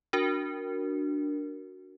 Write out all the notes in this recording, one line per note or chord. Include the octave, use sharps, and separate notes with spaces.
D4 F#4 A#4